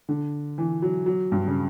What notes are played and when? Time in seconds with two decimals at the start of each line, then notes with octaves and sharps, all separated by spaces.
0.09 D3
0.58 E3
0.82 F#3
1.06 F#3
1.32 G2
1.47 C#3